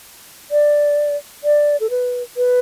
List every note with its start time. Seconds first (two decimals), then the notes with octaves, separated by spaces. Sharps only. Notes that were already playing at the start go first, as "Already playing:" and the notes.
0.51 D5
1.44 D5
1.80 A4
1.90 B4
2.37 B4